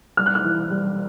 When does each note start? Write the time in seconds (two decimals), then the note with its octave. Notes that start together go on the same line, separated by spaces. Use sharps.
0.17 G3 F6
0.26 F#6
0.35 F6
0.44 E3
0.70 G3